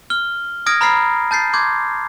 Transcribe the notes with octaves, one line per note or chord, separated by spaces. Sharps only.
F6 G7
D#6 F6 G#6 A#6 D7
A#5 B5 F6 A6 C7
A5 G6 A6 C7
C6 D6 G6 G#6